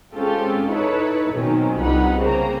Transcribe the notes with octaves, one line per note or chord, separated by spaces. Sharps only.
G#3 C4 C#4 F4 G4 A4
D#4 E4 A4 B4 C#5
B2 D#3 F#3 C4 C#4
G1 C2 C3 D#4 F#5 B5
C#3 A#3 C4 A#5